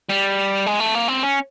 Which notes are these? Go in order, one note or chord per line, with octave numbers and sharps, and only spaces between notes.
G3
G#3
A3
A#3
C4
C#4